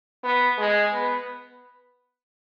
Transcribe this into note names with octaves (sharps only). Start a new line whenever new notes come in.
B3
G#3
B3